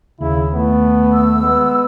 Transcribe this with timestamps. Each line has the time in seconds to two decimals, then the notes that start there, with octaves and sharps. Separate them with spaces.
0.21 D#2 C#3 E4
0.54 A3 B3
1.13 E6
1.42 G#3 B3